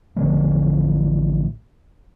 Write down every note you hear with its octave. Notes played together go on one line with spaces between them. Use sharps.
A1 D3 F3 A3